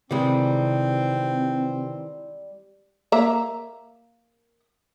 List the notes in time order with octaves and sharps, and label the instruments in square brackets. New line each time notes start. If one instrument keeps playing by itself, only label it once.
[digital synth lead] C3 [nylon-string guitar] D#3 E3 B4 [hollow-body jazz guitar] G3 G#3 [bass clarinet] C4
[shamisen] A#3 E5 A#5